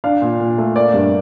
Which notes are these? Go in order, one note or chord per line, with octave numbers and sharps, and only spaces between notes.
D4 F5
A#2
A#2
A3
A#3 D5
G2